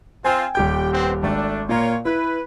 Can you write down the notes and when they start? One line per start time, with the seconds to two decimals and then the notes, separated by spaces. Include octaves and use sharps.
0.25 C4 F4 G5 G#5
0.55 D#1 G4 G5 G6
0.93 B3 C4
1.23 G#1 A3 D4
1.69 A#2 A#3 F4 C#5 A#5
2.05 E4 B4